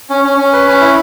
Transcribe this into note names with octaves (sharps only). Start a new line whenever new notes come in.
C#4
C#4
C#4
B4
C#4
E4